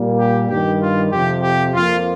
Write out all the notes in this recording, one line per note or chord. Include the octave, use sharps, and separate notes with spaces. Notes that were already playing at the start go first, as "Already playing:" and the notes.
Already playing: A#2 G3 A#3
G4
G2 D#3 G3 G4
F4
F2 C3 F3 G4
G4
F2 F3 A#3 F4